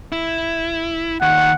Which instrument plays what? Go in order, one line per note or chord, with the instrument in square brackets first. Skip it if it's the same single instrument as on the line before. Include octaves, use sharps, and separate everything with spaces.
[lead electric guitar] E4
[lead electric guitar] D#2 D#3 [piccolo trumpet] F#5